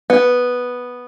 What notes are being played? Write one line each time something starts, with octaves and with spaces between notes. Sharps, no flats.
B3